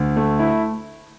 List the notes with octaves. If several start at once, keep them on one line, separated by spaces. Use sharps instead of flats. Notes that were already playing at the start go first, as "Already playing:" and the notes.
Already playing: D2
A3
E4